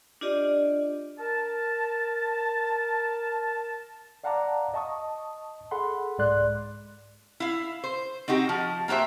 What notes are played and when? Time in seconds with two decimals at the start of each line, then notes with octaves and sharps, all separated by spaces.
0.21 D4 F4 G4 D5 D#5
1.19 A#4 A5
4.24 D5 F5 F#5 A5 A#5 D6
4.74 D#5 A5 C#6 D#6
5.71 G#4 A4 F#5 B5 C6
6.18 C2 G#2 G#3 D5 C6 F#6
7.40 E4 F5
7.84 C5
8.28 C4 D#4 F#4 G4
8.49 F3
8.88 A#3 F#4 G4 C5 E5